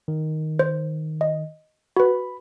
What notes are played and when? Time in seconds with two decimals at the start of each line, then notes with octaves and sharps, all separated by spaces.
0.08 D#3
0.59 C5
1.21 D#5
1.97 F#4 B4 B5